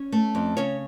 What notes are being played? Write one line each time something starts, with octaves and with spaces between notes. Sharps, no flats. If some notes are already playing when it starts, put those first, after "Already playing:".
Already playing: C#4 C#5
A3
F2
C#3 C#4 C#5